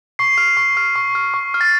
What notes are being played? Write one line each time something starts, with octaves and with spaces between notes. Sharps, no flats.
C#6 C7
F6
C#6
F6
C#6
F6
C#6
F6
A6